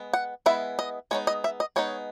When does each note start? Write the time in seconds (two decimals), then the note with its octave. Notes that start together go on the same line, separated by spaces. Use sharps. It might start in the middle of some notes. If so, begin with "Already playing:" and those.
Already playing: G#3 B3
0.13 F#5
0.46 G#3 B3 E4 E5
0.79 D#5
1.11 G#3 B3 D#4 C#5
1.27 D#5
1.44 E5
1.60 D#5
1.76 G#3 B3 D#4 C#5